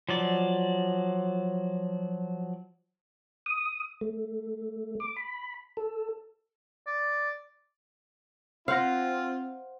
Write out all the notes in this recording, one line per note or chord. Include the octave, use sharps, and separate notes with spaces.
F3 F#3 D5
D#6
A3
D6
B5
A4
D5
C4 F4 C5 F5 F#5 A#6